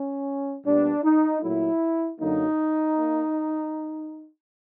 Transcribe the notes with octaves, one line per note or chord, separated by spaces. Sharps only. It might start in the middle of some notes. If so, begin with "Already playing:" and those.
Already playing: C#4
A#2 G3 B3 D4
D#4
A#2 F#3 A3 E4
F#2 D3 F#3 A#3 D#4
A#3